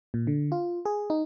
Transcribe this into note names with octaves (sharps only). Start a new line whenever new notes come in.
A#2
D3
F4
G#4
D#4